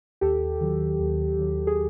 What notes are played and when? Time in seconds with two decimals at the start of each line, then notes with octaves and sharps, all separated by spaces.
0.21 D#2 G4 A4
0.61 D#3 F#3
1.00 D#2
1.39 D#3 F#3
1.67 G#4